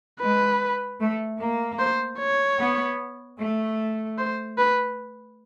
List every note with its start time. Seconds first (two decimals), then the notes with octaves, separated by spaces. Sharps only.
0.21 G#3 B4
1.00 A3
1.40 A#3
1.79 C5
2.19 C#5
2.58 B3
3.38 A3
4.18 C5
4.58 B4